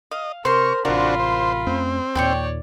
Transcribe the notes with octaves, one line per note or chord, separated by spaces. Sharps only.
D#5 F5
C3 A#4 C5 C6 C#6
A1 C3 D4 F4 F#4 A#4 C5 B5
C5
F2 A3 C4 C#4
D#2 A#2 C#5 D5 G5 C6 C#6